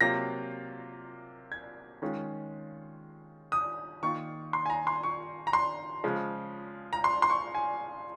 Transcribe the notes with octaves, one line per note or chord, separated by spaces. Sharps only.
C3 F#3 A#3 F4 A#6
G#6
D#3 G#3 C#4 F4
D#6
D#3 A#3 F4 C#6
C6
G#5
A#5
C6
C#6
A#5
C6
C#3 F3 G#3
A#5
C6
C6
C#6
G#5